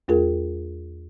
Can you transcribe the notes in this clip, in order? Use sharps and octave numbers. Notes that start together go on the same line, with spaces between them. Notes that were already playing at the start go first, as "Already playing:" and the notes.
E2 A3 F4 G#4 A#4